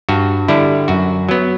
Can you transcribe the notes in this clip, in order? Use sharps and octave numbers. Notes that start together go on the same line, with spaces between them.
G2 F#4
D3 G3 E4
F#2 F#4
F#3 B3